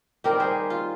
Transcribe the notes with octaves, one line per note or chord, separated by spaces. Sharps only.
D#3 G3 C4 G4 A#4
G#4 C5
F4